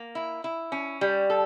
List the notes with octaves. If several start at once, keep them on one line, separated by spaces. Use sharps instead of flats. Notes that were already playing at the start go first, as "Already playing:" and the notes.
Already playing: A#3
E4
E4
C#4
G3
A4